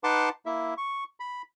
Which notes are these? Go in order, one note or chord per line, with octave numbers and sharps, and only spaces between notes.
D#4 B4 F#5 A5 C6 D6
A#3 E4 E5
C#6
B5